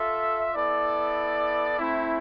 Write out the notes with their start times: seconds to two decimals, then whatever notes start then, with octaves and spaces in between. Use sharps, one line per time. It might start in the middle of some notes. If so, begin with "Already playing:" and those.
Already playing: F4 A4 E5
0.55 B3 E4 A4 D5
1.79 A3 C4 E4